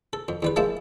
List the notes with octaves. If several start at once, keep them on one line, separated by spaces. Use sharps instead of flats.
A4
F2
E2 G3 B4
F3 G#3 A#3 E5 A5